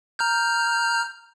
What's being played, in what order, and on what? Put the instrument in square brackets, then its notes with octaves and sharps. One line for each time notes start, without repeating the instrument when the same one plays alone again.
[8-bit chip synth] A#5 F6 G6